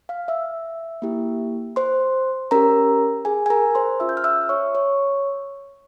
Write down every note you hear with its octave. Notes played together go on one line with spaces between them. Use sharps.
F5 F6
E5 E6
A#3 E4 G4
C5 C6
C#4 G4 A#4 A#5
G#4 G#5
G#5
A#4 A#5
C5 C6
C#4 F4 G#4 E5 E6
G6
F6
E5 E6
C#5 C#6
C#5 C#6